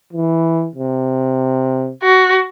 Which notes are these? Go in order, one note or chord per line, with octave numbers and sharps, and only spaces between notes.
E3
C3
F#4